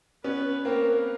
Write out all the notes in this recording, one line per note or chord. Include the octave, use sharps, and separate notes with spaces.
B3 C#4 B4
A#3 C4 A#4